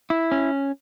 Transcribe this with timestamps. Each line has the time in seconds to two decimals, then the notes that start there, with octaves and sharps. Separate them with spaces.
0.10 E4
0.32 C#4